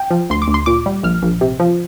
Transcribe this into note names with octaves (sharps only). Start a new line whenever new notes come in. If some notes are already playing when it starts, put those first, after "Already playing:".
Already playing: G5
F3
D2 C6
D6
D2
C6
A#2 D6
G3
A#1 F6
A#1
C3
F3